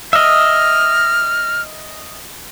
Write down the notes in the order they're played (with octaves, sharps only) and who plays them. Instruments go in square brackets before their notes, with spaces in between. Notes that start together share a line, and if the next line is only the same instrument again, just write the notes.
[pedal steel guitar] D#5 E5 [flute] F6